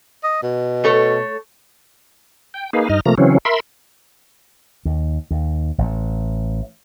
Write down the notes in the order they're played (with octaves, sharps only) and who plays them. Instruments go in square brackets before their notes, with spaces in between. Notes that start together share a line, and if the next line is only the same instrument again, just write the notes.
[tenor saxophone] D#5
B2
[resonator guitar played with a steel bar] A3 A4 C#5
[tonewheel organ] G5
A#3 D#4 G#4 B4 F5
G2 D#4 D#5 F6
C3 F3 A3 A#3 A#5
C#3 E3 F#3 C4 C#4
A#4 E5 B5 C6
[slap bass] D#2
D#2
A1